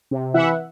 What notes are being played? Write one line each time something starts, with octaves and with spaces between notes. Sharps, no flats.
C3
E3 E5 F#5